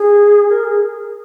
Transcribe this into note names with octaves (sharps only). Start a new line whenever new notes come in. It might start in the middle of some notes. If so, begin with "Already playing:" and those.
Already playing: G#4
A#4
G#4